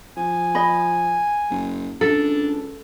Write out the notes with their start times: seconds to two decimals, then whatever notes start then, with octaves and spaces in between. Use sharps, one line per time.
0.17 F3 G#5
0.55 D#5 B5
1.50 F#1
2.01 C#2 D4 A4